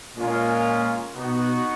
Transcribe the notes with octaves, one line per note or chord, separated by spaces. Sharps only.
A#2 G#3 C#4 F4 A#4
B2 B3 D#4 F#4